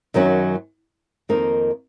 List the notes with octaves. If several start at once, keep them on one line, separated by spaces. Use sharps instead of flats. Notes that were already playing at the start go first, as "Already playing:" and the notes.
F#2 D#3 F#3 C#4 F#4
F2 D#3 A#3 D#4 A#4